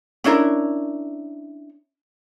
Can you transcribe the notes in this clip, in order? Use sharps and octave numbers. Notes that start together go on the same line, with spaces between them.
C#4 D4 E4 A#4